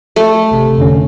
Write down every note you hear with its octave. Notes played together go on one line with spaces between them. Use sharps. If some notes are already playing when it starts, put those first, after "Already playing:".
A3
G#1 C3
F2 D3 C#4